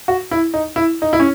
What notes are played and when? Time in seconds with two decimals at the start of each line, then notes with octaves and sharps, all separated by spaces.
0.08 F#4
0.31 E4
0.54 D#4
0.76 E4
1.02 D#4
1.13 E4
1.20 C#4